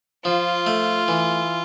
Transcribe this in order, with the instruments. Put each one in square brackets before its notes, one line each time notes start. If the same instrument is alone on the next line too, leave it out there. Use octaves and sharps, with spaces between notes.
[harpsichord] F3 [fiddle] F4
[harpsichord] A3
E3